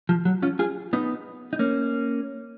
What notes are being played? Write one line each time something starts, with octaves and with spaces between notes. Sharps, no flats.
F3
F#3
C#4 F4
F4 G#4
B3 D#4
D#4
A#3 C#4